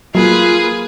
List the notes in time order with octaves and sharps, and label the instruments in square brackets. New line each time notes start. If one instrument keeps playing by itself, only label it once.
[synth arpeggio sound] F#3 [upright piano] A#3 [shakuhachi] F4 [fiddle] G#4 B4